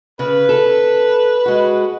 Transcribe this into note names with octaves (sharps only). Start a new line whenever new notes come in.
C#3 B4
A4
G#3 F#4